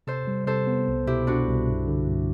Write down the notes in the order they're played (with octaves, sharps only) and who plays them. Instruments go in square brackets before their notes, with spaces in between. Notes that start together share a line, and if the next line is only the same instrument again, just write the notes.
[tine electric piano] C3 [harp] A4 C5
[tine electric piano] G3
[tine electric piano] C3 [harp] A4 C5
[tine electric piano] B3
C2
[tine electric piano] B2 [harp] E4 G4
[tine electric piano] B2 [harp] D4 F#4
[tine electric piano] C2
G2
D3
G2